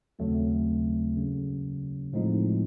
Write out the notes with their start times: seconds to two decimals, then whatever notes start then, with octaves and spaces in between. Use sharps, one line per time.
0.19 D#2 C#3 F#3 A3 C4
1.16 C#3 F#3 A#3 C#4
2.13 A2 F3 G#3 C4 D#4